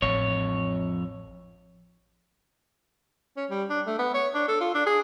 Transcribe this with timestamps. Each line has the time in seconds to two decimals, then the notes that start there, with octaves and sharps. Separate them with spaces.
0.02 A1 F2 C#5
3.37 C#4
3.50 G3
3.70 D4
3.86 A3
3.99 B3
4.14 C#5
4.35 D4
4.48 A4
4.61 F4
4.74 D4
4.86 G#4